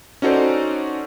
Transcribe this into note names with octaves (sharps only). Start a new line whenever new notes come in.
C#4 D#4 F#4 A4 C5 D5